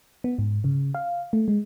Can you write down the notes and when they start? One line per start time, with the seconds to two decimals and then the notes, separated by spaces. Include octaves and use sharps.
0.24 B3
0.39 G#2
0.64 C#3
0.94 F5
1.33 A3
1.48 G#3